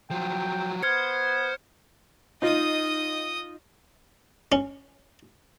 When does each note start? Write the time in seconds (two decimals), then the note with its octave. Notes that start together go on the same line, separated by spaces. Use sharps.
0.11 F3 F#3 G5
0.83 B3 C5 F6 G#6 C#7
2.42 D#4 F4 D#5 D#6
4.52 C#4